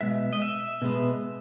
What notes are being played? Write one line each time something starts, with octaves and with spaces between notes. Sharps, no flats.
B2 G#3 E5
D#5
E5
B2 G#3 B3